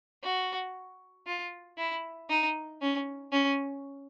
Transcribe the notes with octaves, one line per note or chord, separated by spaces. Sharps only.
F#4
F4
E4
D#4
C#4
C#4